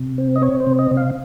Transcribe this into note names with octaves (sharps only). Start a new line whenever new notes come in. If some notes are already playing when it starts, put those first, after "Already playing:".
Already playing: C3
C4
D#5
C4 C#5
C5
C3
D#5
C3
F5